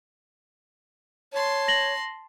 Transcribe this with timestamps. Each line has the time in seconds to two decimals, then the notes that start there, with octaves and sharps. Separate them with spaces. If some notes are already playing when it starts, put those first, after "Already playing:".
1.32 C#5 A5 C6
1.68 A#6 F#7 G7